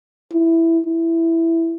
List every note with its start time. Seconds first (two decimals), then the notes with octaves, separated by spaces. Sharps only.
0.33 E4
0.86 E4